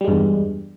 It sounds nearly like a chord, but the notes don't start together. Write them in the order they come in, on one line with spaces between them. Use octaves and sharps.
G3 G#3 G2 E2